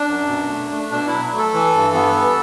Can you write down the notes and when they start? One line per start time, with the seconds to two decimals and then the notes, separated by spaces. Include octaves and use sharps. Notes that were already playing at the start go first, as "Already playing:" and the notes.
Already playing: D4
0.08 F#2
0.28 B2
0.49 A3
0.71 A3
0.92 B2 D4
1.07 F#3 E4
1.32 A3
1.38 A4
1.54 E3
1.74 G2
1.94 B3
2.15 E3